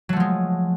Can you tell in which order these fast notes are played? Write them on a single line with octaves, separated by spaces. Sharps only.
F#3 A3 F3 G#3